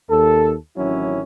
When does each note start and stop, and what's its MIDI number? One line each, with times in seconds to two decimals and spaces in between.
0.10 0.54 39
0.10 0.54 69
0.77 1.22 33
0.77 1.22 51
0.77 1.22 54
0.77 1.22 60
0.77 1.22 61
0.77 1.22 64